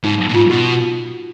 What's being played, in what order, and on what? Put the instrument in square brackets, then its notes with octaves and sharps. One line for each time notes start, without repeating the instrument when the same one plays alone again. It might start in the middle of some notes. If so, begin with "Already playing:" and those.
[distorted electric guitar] G#2 [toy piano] D#4
[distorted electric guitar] A#2
[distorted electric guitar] G#2 [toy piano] F4
[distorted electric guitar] B2 [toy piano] F#4